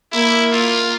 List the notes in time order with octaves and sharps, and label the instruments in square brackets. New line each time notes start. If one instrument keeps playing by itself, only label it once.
[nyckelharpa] A#3 [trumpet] E4
[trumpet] F4